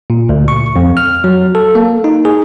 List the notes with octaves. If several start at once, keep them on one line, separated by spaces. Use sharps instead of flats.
A#2
D2
C#6
F2
F6
F#3
A4
A#3
D#4
G#4